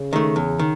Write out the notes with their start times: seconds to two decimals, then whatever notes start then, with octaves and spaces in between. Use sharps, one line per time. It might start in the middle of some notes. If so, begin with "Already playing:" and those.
Already playing: C#3
0.13 D#3 A3
0.36 E2
0.59 D#3